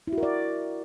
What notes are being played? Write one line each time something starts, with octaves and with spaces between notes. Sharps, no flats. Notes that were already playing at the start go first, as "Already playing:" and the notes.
E4
F#4
A#4
D5